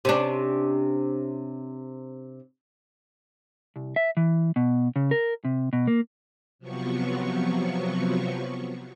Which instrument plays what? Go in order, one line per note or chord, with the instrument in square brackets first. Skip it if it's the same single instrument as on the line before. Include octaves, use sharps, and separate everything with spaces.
[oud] C3 C#4 D4
[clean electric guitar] C2
E5
E3
B2
C#3
A#4
C3
B2
A#3
[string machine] C3 F3 F#3 B3 C#6